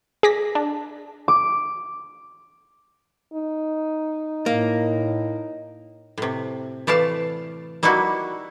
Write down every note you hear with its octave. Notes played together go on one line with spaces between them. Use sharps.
G#4 D6 A#6 B6
D4
D6
D#4
A2 A#3
A2 C3
E3 A3 D5 F5 A5
G3 A#3 D#4 E4 F#4